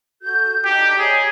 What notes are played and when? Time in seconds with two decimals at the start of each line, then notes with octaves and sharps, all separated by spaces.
0.22 F#4 A4 G6
0.65 D4 D#4 G4
0.99 G#4 C#5 D#5 A#5